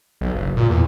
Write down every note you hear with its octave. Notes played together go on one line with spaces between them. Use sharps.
B1
F#1
A#2
E2